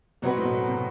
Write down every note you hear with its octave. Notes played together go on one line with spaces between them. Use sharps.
F#2 B2 F#3 C4 F#4 B4
A2
B2
C3